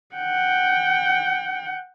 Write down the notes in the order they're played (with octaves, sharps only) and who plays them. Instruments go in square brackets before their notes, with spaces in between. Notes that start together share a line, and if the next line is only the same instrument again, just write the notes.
[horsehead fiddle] F#5 G5